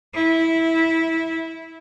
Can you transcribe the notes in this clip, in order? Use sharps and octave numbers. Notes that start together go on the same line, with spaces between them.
E4